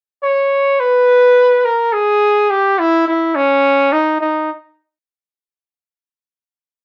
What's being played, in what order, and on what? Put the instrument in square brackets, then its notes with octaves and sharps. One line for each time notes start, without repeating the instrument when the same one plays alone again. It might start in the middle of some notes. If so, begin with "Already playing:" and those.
[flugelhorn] C#5
B4
A#4
G#4
G4
E4
E4
C#4
D#4
D#4